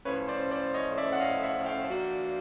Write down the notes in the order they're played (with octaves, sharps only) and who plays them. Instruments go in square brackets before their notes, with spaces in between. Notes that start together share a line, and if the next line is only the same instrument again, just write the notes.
[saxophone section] A2 F3 A3 C#4 [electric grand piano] B4 C#5
[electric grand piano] C5 D5
C5 D5
C#5 D#5
D5 E5
F#5
D#5 F5
E5 F#5
F5 G5
[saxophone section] F3 A#3 D4 F#4